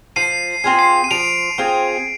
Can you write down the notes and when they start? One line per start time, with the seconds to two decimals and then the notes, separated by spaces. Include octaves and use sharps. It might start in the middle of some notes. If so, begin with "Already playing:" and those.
0.16 F3 C7 D#7
0.64 C4 F4 G#4
0.79 C7
1.04 D#7
1.11 F3 D7 F7
1.58 C4 F4 G#4